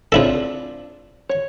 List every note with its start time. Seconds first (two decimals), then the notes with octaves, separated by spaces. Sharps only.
0.12 C#3 C4 D4 E4 F4 A4
1.29 C#5